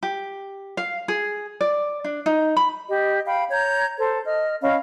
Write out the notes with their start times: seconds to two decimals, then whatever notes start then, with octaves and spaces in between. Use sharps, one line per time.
0.03 G4
0.77 F5
1.08 G#4
1.61 D5
2.04 D4
2.26 D#4
2.57 B5
2.88 G4 D#5
3.26 F5 G5 B5
3.50 C#5 A#5 G6
3.97 A4 C5
4.26 D#5 F6
4.61 C#4 D#5 F5 B5